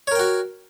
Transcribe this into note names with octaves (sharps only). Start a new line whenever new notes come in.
F#4 A#4 C#5 G5